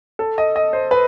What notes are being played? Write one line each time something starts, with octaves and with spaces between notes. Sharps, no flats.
A4
D#5
D#5
C5
B4